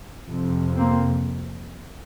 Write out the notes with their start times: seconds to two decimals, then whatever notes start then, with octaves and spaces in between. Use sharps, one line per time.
0.27 F2 C3
0.77 A#3 C4